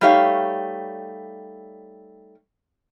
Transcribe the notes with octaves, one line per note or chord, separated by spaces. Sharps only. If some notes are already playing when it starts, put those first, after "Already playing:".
G3 A3 D#4 G4 C#5 F5